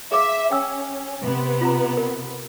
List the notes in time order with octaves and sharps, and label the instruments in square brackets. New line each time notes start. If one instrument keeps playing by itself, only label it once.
[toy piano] G#4 F5 D6 [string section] E5
[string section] C#4 [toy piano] G5 E6
[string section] C3 B3
[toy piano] F4 A#5
A#4